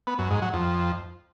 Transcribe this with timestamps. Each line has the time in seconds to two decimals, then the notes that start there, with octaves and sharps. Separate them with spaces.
0.07 B3
0.19 F#2
0.30 G#2
0.42 F#3
0.54 F2